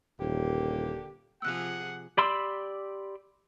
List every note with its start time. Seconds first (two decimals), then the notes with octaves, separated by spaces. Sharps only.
0.20 D#1 D3 A#3 G4
1.42 C3 F3 G#4 F#5 E6 F#6
2.17 G4 D5 B5 C6 E6